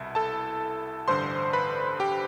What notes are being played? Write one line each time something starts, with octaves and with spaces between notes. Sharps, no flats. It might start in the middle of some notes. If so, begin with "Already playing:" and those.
Already playing: C2 B2 E4
A4 A5
A1 G2 D3 C5 C6
B4 B5
G4 G5